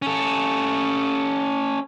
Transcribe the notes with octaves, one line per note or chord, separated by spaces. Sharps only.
C#4 A4